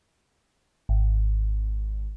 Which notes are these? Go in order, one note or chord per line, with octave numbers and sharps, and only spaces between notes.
G#1